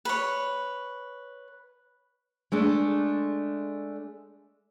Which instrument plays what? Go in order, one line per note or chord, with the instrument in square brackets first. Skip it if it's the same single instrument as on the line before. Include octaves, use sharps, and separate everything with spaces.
[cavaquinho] B4 C#5
[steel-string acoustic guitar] G#3 A3 D4